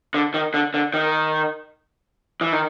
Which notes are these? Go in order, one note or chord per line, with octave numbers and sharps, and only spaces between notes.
D3
D#3
D3
D3
D#3
E3
D#3